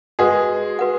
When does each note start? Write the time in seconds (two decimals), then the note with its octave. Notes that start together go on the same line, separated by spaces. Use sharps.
0.19 G#3 F#4 G#4 B4 F#5
0.79 F#4 B4 F#5